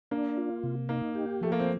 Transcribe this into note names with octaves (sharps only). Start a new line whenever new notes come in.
A#3 D4
F4
C3
A#3 D#4
G4
F3 A3
A#3
C4